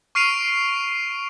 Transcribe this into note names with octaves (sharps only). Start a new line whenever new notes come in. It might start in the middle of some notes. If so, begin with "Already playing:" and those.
C#6 F6 C7 D7 D#7 F7